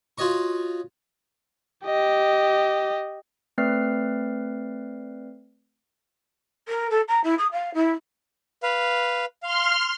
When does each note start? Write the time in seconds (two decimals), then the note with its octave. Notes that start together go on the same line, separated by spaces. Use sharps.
0.18 F4 F#4 C#5 D#5 C#6
1.86 G4 D#5
3.58 A3 C4 B4 D5 F6 C7
6.68 A#4
6.90 A4
7.08 A#5
7.24 E4
7.38 D#6
7.52 F5
7.74 E4
8.63 B4 F5
9.43 F5 C6 F6